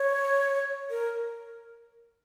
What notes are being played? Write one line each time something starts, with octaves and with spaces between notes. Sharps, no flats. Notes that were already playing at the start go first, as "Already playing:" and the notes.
Already playing: C#5
A#4